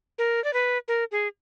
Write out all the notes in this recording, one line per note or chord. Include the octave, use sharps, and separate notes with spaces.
A#4
D5
B4
A#4
G#4